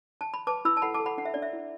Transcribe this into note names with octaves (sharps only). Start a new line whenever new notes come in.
A5
B5
B4 A5 D6
E4 B5 E6
A5
A4 F#5 B5
A5 D6
A4
F#5 B5
D4 F#5
E5
D4 D5
E5
E4